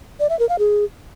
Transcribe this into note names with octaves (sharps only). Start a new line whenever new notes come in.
D5
E5
A#4
F5
G#4